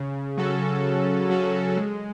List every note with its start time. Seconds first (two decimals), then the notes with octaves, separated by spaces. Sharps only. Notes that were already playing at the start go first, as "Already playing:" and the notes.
Already playing: C#3
0.37 F#3 C#4 F#4 A4
0.83 C#3
1.30 F#3 C#4 F#4 A4
1.77 G#3